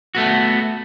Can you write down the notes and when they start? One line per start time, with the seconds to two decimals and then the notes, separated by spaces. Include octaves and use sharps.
0.15 A3 B3 F#4